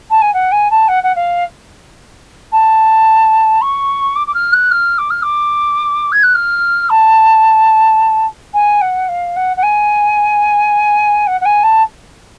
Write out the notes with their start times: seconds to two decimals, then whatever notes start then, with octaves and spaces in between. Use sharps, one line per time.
0.10 A5
0.21 G#5
0.33 F#5
0.51 G#5
0.70 A5
0.88 F#5
1.03 F#5
1.15 F5
2.52 A5
3.61 C#6
4.15 D6
4.27 D6
4.34 F6
4.52 F#6
4.71 F6
4.98 D6
5.10 F6
5.22 D6
6.12 G#6
6.23 F#6
6.34 F6
6.89 A5
8.53 G#5
8.81 F#5
9.08 F5
9.36 F#5
9.56 F#5
9.62 G#5
11.27 F#5
11.40 F#5
11.45 G#5
11.63 A5